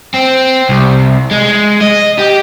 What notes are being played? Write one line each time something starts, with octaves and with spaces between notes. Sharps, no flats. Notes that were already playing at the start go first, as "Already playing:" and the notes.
C4
C2
G#3
D#5
G4